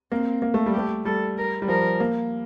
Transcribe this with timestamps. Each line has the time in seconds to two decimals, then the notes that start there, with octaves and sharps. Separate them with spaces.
0.11 A#3 C4
0.42 A#3
0.54 A3
0.66 G3
0.74 G4
0.78 A3
1.05 G3 A4
1.37 A#4
1.62 G3
1.68 F3 A#4
2.00 A#3